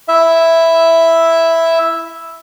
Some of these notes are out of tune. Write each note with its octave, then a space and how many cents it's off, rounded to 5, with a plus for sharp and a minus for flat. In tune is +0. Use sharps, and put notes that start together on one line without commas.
E4 +0 E5 +0